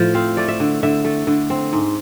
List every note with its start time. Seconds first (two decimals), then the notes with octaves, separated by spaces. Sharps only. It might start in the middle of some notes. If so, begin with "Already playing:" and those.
Already playing: A2 F3 A3
0.14 C4 F5
0.37 A3 D5
0.48 E5
0.60 D3
0.83 D3 E5
1.04 A3
1.27 D3
1.50 C4
1.73 G#2